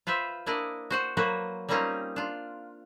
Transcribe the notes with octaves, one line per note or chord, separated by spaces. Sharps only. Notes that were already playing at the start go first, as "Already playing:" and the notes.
F4 B4 C5 E5
A#3 D4 E4 D5 D#5
F#4 C5 F#5
F#3 A#3 F#4 B4 C5
G3 A#3 C4 C#4 D#4 F4
D4 F4